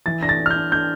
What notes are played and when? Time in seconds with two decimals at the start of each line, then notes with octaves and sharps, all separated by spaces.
0.06 E3 A6
0.22 D4 A#6
0.29 A6
0.40 D4
0.46 F6
0.51 G6
0.56 D4
0.72 D4 G6